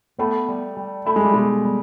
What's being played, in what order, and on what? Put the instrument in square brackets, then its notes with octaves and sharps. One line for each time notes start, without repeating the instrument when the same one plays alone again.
[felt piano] A3 [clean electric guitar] B3
[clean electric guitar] G3
G3
[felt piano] A3 [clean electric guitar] E4
[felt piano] G#3
G3
[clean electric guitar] B2 [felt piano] G#3
[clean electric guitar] G3